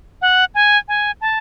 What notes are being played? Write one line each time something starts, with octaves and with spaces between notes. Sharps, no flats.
F#5
G#5
G#5
A5